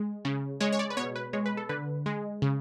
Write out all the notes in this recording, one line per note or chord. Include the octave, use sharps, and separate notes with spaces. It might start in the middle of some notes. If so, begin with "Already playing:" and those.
Already playing: G#3
C#3
G#3 C#5
C#5
D5
B4
B2 C#5
B4
G#3 C#5
B4
A4
D3 B4
G#3
C#3